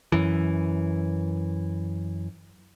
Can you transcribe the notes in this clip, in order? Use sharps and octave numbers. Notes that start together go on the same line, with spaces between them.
F#2 E3